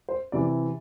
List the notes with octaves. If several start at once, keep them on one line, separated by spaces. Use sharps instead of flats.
C5
C3 E3 D5